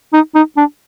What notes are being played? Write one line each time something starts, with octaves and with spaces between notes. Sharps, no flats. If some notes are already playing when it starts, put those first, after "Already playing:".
D#4
D#4
D4